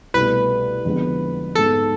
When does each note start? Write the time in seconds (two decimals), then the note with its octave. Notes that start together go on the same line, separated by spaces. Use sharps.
0.14 C2 B2 A3 B4
0.85 F2 D3 G#3 B3
1.55 G#2 G#3 B3 A4